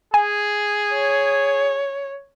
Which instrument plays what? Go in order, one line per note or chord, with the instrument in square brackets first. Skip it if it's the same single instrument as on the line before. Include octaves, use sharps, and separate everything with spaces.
[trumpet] G#4 [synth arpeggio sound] G#5
[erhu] C#5